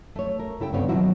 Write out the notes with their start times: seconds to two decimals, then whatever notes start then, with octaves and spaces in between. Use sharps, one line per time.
0.16 A3 C#5
0.39 A#4
0.60 C#3 E4 A4 G5
0.73 G2 C#3 B3 C4 C#5
0.89 B2 D#3 F3 F#3 E4 F#4